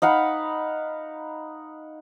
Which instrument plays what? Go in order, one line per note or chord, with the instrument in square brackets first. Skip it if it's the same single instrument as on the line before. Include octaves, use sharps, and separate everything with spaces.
[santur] D#4 F5 F#5 B5